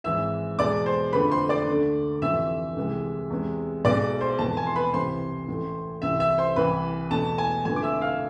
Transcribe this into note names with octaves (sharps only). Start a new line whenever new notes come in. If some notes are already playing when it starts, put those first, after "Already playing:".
G#1 G#2 E3 G#3 E5 E6
E2 B2 G#3 D5 D6
C5 C6
F2 D3 A3 B4 B5
C5 C6
D5 D6
D2 D3 A3
F1 F2 C3 E3 E5 E6
C2 C3 E3 G#3
E2 C3 G#3
B1 B2 G#3 D5 D6
C5 C6
F1 E2 B2 A5
G#5
C6
B4 B5
C2 C3 E3 C5 C6
A1 A2 E3 A3
C2 C3 E3 E5 E6
E5 E6
C5 C6
C2 C3 E3 B4 B5
E2 B2 A3 A5
G#5
F1 F2 D3 A3 G#5
D6
E5 E6
F5 F6